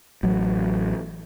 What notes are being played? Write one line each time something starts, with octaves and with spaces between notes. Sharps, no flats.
A1 F#3